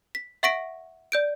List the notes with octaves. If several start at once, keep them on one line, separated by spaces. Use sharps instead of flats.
B6
E5 F#5 C#6 A#6 B6 D7
D5 G6 D7